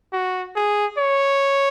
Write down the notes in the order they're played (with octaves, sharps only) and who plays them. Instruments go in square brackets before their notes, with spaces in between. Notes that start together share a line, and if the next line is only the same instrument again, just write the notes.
[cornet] F#4
G#4
C#5